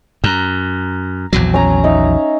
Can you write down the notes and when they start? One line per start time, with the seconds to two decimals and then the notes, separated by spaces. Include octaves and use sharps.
0.24 F#2 A#5
1.33 A#1 E2 F#3
1.54 C#4 A#5
1.84 D#4 E5